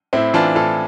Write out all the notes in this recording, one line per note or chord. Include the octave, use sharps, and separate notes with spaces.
A2 C4 E4
E3 D4 F4
A2 F4 A4